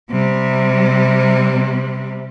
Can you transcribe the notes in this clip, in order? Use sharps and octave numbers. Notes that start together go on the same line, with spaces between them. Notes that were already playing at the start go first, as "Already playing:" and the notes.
C3 G3